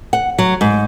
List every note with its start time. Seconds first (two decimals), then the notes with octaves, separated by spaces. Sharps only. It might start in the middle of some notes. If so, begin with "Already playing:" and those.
0.13 F#5
0.38 F#3
0.61 G#2